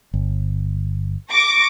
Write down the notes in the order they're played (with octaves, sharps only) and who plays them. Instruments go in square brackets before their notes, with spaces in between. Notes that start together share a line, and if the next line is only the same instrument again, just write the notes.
[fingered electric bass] G1
[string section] C#6 D6 A#6